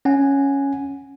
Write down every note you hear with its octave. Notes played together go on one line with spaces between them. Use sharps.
C#4 F#5 G#5